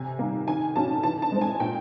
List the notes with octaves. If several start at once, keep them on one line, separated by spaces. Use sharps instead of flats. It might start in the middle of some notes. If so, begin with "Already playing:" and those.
Already playing: C3 G#5
D#3 G3 A#3
D#3 G#5
F#3 A#3 C#4 A5
E3 A5
A5
G#3 C4
G#5
A#2 G5